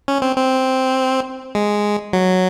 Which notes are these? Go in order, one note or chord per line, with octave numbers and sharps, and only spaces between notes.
C#4
C4
C4
G#3
F#3